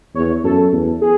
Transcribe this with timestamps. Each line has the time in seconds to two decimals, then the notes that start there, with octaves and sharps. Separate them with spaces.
0.15 E2 C#5
0.44 F#2 A4
0.73 E2
1.01 G#4